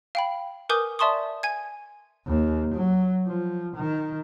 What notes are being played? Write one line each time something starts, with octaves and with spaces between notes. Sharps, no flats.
F5 G5 B5
A#4 B4 G#5 D6 D#6 G6
D5 E5 A5 C6 C#6 D#6
G#5 G#6
D#2
F#3
F3
D#3